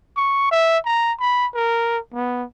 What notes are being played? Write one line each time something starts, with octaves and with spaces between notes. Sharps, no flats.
C#6
E5
A#5
B5
A#4
B3